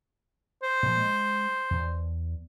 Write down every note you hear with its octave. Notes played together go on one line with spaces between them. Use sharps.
C5
A#2 F3
G#3
E2